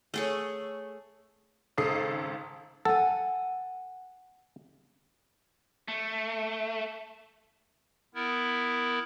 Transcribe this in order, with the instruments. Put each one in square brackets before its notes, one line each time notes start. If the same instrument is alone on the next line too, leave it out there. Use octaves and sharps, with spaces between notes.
[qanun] A3 G#4 C#5
[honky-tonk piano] G#1 C#2 A4 D#6 C7
[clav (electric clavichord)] A4 [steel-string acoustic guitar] F#5 G#5
[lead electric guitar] A3
[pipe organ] B3 E4 A#4